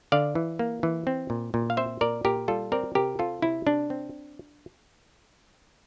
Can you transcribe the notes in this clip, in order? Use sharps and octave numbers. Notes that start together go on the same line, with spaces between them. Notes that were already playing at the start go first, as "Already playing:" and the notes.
D3 D5 F5
E3
A#3
E3
C4
A#2
A#2
F5
C4 C5 E5
A#2 A#4 D5
A#2 G4 A#4
G3 F4 A4
C4 A#4 D5
C3 G4 A#4
C4 F4 A4
C3 E4
C3 D4
C4